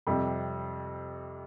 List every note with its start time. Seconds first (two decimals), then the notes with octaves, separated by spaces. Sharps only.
0.07 F2 C3 G3